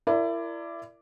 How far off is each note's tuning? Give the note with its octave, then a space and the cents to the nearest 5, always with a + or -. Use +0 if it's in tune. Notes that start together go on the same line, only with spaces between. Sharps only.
E4 +30 A#4 -20 D5 +0